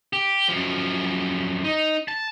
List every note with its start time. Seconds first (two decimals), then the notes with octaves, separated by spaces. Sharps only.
0.13 G4
0.49 F#2 F3
1.64 D#4
2.08 A5